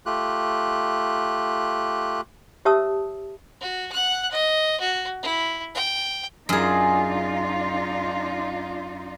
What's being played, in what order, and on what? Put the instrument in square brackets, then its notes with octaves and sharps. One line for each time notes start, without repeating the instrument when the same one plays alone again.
[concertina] A3 F4 G4 F#6
[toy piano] G4 C#5 E5 A5 D#6 E6
[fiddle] F#4
F#5 F#6
D#5
F#4
E4
G5
[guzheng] F#2 G#4 [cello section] D4 D#4 F4